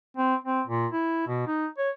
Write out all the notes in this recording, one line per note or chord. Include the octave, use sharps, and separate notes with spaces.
C4
C4
A#2
E4
B2
D#4
C#5